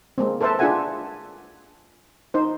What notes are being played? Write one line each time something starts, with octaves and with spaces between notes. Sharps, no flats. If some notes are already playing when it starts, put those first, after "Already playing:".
G#3 A#3 C4
A4 B4 C5 E5 A5
D4 F4 G#4 E5 F#5 G#5
D#4 C5